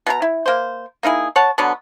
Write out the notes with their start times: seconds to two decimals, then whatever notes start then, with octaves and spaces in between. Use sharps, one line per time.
0.07 B2 E4 A#5
0.22 E4
0.46 A#3 C5
1.03 A#3 D#4 E4 G#4
1.36 C#5 F#5 A5
1.58 B2 D3 F#3 B3